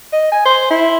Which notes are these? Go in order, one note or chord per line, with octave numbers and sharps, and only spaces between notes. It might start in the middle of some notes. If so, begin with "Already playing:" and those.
D#5
G#5
C5
E4